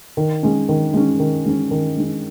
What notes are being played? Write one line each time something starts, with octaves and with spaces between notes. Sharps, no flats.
D#3
G#3 C#4
D#3
G#3 C#4
D#3
G#3 C#4
D#3
G#3 C#4